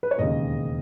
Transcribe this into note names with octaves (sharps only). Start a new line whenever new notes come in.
B4
C#5
E1 D#2 C#3 D#5